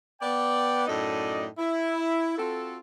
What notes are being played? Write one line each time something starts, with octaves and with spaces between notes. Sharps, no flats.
B3 D5 G5
F#2 A2 A3 D#4 D5 D#5
E4
C4 F4 F#4 A4